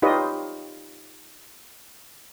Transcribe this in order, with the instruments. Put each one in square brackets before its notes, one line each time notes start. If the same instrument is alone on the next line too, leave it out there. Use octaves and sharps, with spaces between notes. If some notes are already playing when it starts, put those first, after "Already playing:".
[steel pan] D#4 F4 G4 B4 C#5 D#5